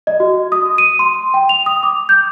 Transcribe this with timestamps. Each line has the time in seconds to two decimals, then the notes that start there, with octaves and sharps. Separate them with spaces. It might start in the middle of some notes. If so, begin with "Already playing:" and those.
0.07 D#5
0.20 F#4
0.52 D#6
0.78 D#7
0.99 C6
1.34 G5
1.49 F7
1.66 D#6
1.83 D6
2.09 G6